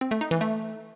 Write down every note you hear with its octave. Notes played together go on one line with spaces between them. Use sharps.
C4
A3
D#4
E3
A3